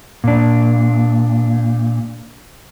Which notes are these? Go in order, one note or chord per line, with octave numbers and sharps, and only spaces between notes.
A#2 D4